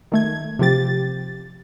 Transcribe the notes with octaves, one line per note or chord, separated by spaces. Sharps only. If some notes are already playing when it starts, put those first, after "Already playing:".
D#3 A3 G#6
C3 F3 G4 A6